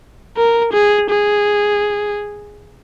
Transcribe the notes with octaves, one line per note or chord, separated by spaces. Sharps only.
A#4
G#4
G#4